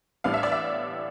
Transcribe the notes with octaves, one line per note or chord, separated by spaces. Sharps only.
A1 A2 G3 B3 D4 F5
E5
D5
E5